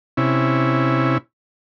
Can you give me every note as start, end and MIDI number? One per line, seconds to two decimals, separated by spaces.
0.17 1.18 48
0.17 1.18 61
0.17 1.18 64